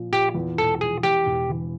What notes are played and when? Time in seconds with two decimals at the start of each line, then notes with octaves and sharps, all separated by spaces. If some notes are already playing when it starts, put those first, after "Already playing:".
Already playing: A#2 F3
0.12 A#2 G4
0.35 E2
0.57 E1 A4
0.80 F3 G#4
1.03 E2 G4
1.26 E1
1.49 E3